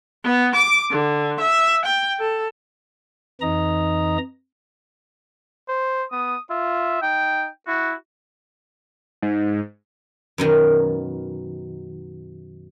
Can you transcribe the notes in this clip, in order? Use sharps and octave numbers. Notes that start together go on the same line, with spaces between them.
B3
D6
D3
E5
G5
A4
F2 E3 D#4 D#5 A#5 D#6
C5
B3 D#6
F4 E5
D#4 G5
E4 F#4
G#2
F#2 B2 D#3